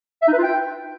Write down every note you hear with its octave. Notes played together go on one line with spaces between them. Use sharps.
E5
D#4
B4
F4
G5